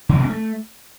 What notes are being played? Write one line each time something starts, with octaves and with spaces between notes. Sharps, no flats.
C#3
D3
B2
C#4
A3